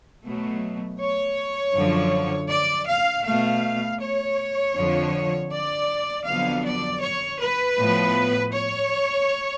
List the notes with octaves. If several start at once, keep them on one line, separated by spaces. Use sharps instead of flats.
B2 F#3 A3
C#5
F#2 D3 F3
D5
F5
B2 A3 F5
C#5
F2 D3 F3
D5
F2 D3 F#3 B3 F5
D5
C#5
B4
A2 F3 B3
C#5